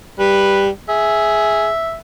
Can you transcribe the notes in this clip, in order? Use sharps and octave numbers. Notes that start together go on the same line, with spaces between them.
G3 B4
G#4 E5